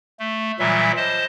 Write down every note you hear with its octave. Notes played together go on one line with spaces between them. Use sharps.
A3
A#2 E3 F#3 G3 E5
C5 D#5 A5